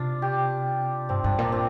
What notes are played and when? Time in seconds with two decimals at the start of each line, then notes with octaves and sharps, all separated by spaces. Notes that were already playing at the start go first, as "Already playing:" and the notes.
Already playing: C3 D4 F4
0.22 G4
1.09 G2 C4
1.24 G2 D4
1.38 A#2 D4
1.52 C4